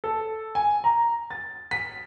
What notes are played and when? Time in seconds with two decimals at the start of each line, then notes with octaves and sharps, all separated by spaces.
0.04 A4
0.55 G#5
0.84 A#5
1.30 A6
1.71 B6